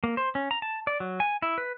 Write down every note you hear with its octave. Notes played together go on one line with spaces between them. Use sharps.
A#3
C5
C#4
A#5
A5
D5
F#3
G#5
E4
B4